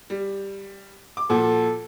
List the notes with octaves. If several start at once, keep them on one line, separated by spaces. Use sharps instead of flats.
G3
D6
A#2 F3 F#4 A4